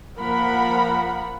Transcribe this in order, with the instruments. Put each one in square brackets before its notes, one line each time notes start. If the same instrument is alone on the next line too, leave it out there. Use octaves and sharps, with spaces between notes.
[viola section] F3 A#3 A#4 F#5 B5